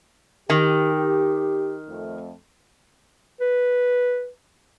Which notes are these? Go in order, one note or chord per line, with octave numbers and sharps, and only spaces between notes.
D#3 G4
F2 A3
B4